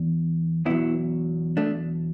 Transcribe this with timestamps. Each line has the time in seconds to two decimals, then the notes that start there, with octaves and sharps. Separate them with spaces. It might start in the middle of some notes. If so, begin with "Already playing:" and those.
Already playing: E2
0.65 E2 B2 F#3 B3 E4
1.57 A3 D4